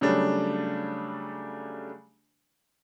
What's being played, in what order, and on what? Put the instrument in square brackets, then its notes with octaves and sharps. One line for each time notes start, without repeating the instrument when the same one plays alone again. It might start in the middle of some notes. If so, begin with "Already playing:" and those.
[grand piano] C#3 F#3 G3 A3 D4